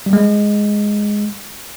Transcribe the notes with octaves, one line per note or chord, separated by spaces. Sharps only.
G3
G#3